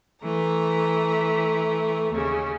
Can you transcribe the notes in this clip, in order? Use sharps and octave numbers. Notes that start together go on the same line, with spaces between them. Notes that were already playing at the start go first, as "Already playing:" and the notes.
E3 A3 A#5
D#2 C#3